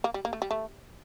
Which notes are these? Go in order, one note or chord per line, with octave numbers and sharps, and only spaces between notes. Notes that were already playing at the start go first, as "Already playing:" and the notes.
A#3
G3
A#3
A3
G3
A3